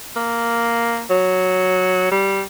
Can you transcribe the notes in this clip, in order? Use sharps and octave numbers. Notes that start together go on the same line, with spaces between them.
A#3
F#3
G3